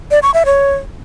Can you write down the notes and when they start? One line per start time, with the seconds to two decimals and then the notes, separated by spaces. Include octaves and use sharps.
0.11 D5
0.23 C#6
0.34 E5
0.46 C#5